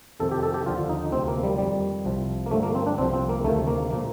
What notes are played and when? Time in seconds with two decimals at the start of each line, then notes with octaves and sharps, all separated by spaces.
0.20 F2 C3 D#3 A4
0.32 G4
0.43 A4
0.54 G4
0.66 D#2 D3 F3 F4
0.89 D#4
1.12 D2 C3 F3 C4
1.28 A#3
1.43 G3
1.58 F2 D#3 G3
2.05 C2 C3 F3
2.46 A#3
2.51 G2 D3 F3 A3
2.63 A#3
2.75 C4
2.86 D4
2.98 C2 C3 F3 C4
3.13 C4
3.29 A#3
3.44 D2 C3 D#3 A3
3.67 A#3
3.91 A#2 F3 A#3